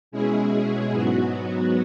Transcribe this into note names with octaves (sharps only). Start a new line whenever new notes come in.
B2 G#3 C#4 E4 G#4
G#2 F#3 B3 F#4